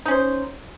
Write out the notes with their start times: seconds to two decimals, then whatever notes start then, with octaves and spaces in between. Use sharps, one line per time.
0.06 D#4
0.08 C#4
0.11 C5